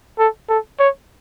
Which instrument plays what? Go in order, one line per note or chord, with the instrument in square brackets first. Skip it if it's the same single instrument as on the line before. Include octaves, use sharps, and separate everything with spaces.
[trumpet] A4
A4
C#5